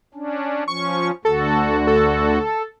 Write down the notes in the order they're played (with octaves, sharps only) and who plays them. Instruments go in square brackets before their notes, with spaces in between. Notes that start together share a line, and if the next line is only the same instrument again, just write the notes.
[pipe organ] C#4 D4
[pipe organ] F3 C#4 [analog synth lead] C#6
[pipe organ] D2 D3 F#4 [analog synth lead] A4
[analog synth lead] A4